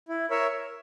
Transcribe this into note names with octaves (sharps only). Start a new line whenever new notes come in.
E4
A#4 C#5 E5